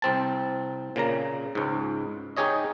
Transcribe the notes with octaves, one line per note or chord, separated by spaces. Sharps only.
C2 C4 A5
A#2 C#3 A#3 A#5
C#2 G#2
D#4 G4 G#4 C#5 D#5